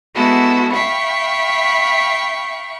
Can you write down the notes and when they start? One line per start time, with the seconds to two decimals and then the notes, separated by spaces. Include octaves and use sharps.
0.14 G#3 B3 E4 F#4 A4
0.73 E5 F5 G5 B5 C#6